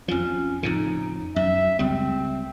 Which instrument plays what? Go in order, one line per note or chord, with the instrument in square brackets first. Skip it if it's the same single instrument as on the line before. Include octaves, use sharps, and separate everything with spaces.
[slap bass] F2 F3 [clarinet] C#4
[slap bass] F2 A2 C#3 [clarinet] D#4
[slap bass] F#2 [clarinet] E5
[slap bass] C#2 G3 [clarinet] C4